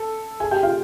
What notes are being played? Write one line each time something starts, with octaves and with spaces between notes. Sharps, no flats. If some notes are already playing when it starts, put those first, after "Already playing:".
Already playing: A4 A5
G#4 G#5
G4 G5
F4 F5